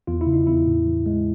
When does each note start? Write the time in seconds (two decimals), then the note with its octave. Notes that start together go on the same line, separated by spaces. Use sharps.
0.07 E2 F4
0.21 E4
0.26 C#3
0.33 D#4
0.46 E2 E4
0.66 A2
0.86 E3
1.06 G#3